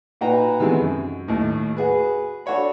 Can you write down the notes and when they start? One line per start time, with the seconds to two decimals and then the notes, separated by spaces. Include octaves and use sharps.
0.21 A#2 D#4 F#4 B4 G5 A#5
0.60 C3 D#3 E3 G#3 A3 B3
0.80 F#2
1.28 D#2 A2
1.77 F#4 G#4 B4
2.46 D4 F#4 A4 C#5 B5